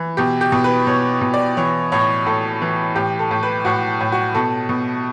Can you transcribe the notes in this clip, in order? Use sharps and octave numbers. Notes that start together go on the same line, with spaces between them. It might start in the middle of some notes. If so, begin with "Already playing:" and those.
Already playing: E3
B2 G4
G4
B2
B4
B2 C#5
B2
D5
E3 C#5
A2 C#5
A2 A4
E3
A2 G4
A4
A2
B4
A2 F#4
A2
F#4
B2 A4
B2